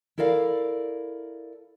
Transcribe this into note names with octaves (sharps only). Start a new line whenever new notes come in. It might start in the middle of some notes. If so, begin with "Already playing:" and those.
E4 A4 A#4 D5 F5